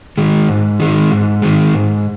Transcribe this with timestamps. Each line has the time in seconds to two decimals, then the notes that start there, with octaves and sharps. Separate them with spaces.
0.18 D#3 G#3
0.48 G#2
0.80 D#3 G#3
1.11 G#2
1.42 D#3 G#3
1.74 G#2